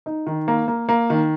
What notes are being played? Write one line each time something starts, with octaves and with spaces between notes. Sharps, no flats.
D#4
D#3
A#3
A#3
A#3
D#3